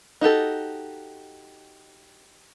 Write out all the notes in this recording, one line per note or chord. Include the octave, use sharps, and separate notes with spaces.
D#4 F#4 G4 A4